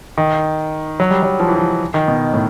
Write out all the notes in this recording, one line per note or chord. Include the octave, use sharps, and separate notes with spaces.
D#3
F#3
G3
F#3
F3
E3
F3
D#3
B2
A2